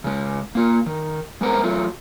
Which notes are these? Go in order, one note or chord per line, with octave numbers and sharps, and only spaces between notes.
C#3 G#3
A#3 F4
D#3
G#3 B3 A#4 C5 A#5
F#3 A3 F4